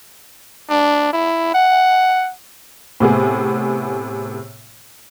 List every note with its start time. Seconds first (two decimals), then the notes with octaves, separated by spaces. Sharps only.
0.70 D4
1.13 E4
1.54 F#5
3.00 A2 C3 B3 G#4